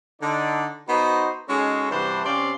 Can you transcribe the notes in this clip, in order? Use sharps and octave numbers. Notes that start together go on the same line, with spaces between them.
D3 D#4 D5
B3 D#4 F#4 C5
G#3 C#4 D#4 F#4 G#4 A4
G2 C3 E3 D4 F#4 C5
C3 C4 C#4 D5 F5 C6